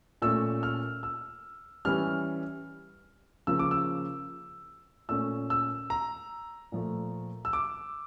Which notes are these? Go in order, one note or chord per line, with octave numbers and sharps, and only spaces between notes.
A#2 A3 C#4 E6
F6
E6
E3 G3 C#4 F6
C#3 F3 A#3 E6
D6
E6
A#2 A3 C#4 E6
E6
A#5
A#2 F3 A3
E6
D6